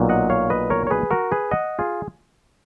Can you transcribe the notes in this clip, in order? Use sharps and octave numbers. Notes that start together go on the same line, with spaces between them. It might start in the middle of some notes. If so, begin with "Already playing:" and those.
Already playing: B1 A#2 F#3
D#5 F#5
C#5 F5
B4 D#5
A#4 C#5
C#5
G#4 B4
F#4 A#4
G#4 B4
D#5 F#5
F4 G#4